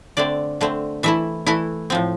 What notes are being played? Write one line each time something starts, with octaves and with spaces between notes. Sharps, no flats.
D3 A3 C4 D5
D3 A3 C4
E3 A3 E4 E5
E3 A3 E4
A2 F3 C4